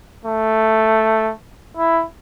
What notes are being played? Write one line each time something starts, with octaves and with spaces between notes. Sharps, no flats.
A3
E4